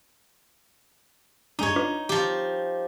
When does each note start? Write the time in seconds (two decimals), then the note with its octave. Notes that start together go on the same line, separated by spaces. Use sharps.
1.59 G2 G#3 D4 D#4 C#5
1.76 D4 F4 B4
2.09 F3 G4